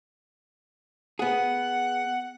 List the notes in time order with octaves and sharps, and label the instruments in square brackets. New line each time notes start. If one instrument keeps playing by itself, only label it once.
[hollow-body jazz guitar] B3 G#4 [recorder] F#5